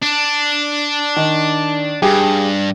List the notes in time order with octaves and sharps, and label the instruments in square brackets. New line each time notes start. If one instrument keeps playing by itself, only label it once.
[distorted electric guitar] D4
[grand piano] D#3
[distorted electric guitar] G2 [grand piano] G4 G#4